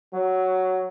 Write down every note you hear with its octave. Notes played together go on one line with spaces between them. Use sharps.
F#3